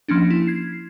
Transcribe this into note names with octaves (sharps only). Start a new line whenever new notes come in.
F3 A#3 C#4 D4
E4
G#6 C7